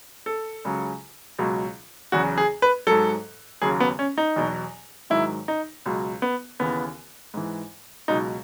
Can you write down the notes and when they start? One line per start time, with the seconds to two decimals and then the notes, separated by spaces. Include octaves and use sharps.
0.26 A4
0.65 C#2 C#3 F#3
1.39 C#2 B2 F#3
2.12 E2 C#3 F#3 F#4
2.38 G#4
2.62 B4
2.87 G#2 F#3 A4
3.62 D#2 C#3 F#3 G#4
3.80 B3
3.99 C#4
4.18 D#4
4.36 E2 B2 F#3
5.10 G#2 D#3 F#3 E4
5.48 D#4
5.86 C#2 B2 F#3
6.22 B3
6.60 D#2 C#3 E3 B3
7.34 G#2 E3
8.08 C#2 B2 F#3 D#4